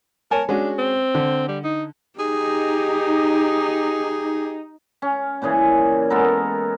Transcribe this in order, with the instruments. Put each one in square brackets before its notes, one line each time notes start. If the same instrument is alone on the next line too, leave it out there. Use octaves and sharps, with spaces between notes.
[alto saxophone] A#4 [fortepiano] C#5 G#5 A5
[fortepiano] G#3 C#4 F#4 [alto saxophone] D4
[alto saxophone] C4
[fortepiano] D3
[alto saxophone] G3
D#4
[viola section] D#4 [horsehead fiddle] G4 [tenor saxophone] G#4
[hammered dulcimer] C#4
A#2 C#3 E3 G#4
G#3 B3 A4 A#4